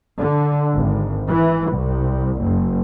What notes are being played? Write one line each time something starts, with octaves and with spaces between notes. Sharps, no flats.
D3
G#1
E3
C2
F#1